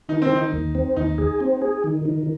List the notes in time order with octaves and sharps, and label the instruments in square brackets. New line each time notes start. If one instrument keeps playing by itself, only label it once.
[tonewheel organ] D#3 [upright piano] D#4
[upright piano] C4
[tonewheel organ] D#3
[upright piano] D#4
[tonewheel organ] D#2
C4
[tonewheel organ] D#2 [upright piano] D#4
[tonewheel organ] G#4
C4
G#4
D#3
D#3